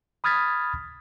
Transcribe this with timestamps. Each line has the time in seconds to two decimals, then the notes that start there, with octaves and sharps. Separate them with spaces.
0.24 B5 D#6 F6 G#6 A6 B6